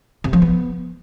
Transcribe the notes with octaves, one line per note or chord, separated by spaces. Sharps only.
C3
F3
B3